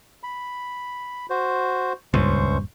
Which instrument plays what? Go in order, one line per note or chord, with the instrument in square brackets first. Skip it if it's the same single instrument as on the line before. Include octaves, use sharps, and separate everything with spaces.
[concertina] B5
F#4 C5
[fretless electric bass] D#1 G2 [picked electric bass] C#2 [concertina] C5 C#6